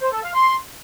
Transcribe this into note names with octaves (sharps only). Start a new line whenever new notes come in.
C5
A4
F5
C6